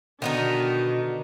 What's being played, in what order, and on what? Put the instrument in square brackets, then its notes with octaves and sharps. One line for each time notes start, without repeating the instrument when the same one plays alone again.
[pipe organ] B2 D3 D#5 [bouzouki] D#3 B3 D#4 [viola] D4 [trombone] F#4